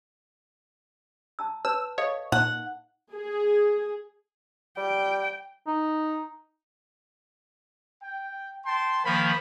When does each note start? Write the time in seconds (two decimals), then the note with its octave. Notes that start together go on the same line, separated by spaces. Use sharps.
1.39 A5 A#5 E6
1.65 B4 C#5 A5 E6
1.98 A4 C#5 D#5 F5
2.32 A#2 D#4 F#5
3.12 G#4
4.77 G3 G5
5.67 D#4
8.01 G5
8.64 G5 A5 C6
9.05 D#3 F3 A#3 B5